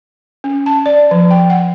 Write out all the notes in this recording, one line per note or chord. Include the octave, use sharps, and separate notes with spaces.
C#4
A5
D5
F3
G5
F#5